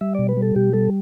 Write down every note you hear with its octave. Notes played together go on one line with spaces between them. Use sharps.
G3 E5
B2 D5
B4
G3
A4
B2 G4
G3 A4